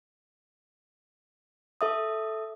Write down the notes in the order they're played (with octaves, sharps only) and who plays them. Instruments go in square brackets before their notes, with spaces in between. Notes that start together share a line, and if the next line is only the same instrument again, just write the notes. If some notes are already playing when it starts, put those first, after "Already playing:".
[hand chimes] A4 E5 D#6